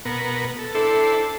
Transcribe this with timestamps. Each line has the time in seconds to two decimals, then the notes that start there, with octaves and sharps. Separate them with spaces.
0.05 B2 B3 A#4
0.59 A4
0.75 D4 E4 A4 C5